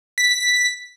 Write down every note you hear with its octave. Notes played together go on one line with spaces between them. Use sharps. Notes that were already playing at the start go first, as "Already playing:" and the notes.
B6